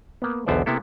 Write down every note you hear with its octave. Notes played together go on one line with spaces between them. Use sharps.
A#3 B3
B1 E2 D3 B3 C5 D5
C3 A#3 B3 E4 A4